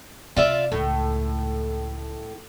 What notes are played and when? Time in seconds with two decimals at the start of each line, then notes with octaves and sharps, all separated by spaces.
0.37 C3 F4 D5 E5
0.72 C#2 A2